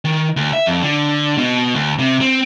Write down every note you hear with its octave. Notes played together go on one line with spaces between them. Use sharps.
D#3
D2
E5
F2
D3
B2
D2
C3
C4